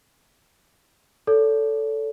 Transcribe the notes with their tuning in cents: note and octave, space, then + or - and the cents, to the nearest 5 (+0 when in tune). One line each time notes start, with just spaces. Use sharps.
A4 +0 C#5 +45